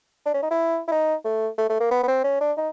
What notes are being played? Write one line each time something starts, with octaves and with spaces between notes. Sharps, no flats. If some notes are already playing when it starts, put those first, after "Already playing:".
D4
C#4
D#4
E4
E4
D#4
A3
A3
A3
A#3
B3
B3
C4
C#4
D4
D#4